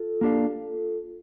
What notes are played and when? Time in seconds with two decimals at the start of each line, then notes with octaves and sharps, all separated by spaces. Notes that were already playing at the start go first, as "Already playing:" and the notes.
Already playing: F4 A4
0.21 A#3 D4 G4 D5 F5